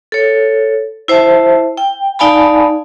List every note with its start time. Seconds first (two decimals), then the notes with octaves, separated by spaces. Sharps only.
0.12 A4 C#5
1.08 E4 C5 E5 A5
1.77 G5
2.19 D#4 D5 F5 G#5 A5 B5